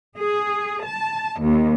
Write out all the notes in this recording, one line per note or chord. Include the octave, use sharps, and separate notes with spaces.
G#4
A5
D#2